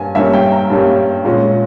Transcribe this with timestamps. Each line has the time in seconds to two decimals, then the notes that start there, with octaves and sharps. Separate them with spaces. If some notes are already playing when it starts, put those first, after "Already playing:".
Already playing: G2 G3 A#3 C#4 G#5
0.15 G2 G3 A#3 C#4 E5
0.33 G5
0.52 A#5
0.70 G2 G3 A#3 C#4
1.24 A#2 G#3 C#4